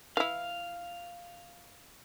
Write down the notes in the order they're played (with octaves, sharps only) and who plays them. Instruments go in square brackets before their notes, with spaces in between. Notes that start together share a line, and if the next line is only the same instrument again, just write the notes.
[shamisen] E3 E4 [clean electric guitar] F5